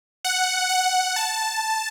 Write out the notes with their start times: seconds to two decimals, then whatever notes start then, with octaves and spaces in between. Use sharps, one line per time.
0.25 F#5
0.69 F#5
1.16 A5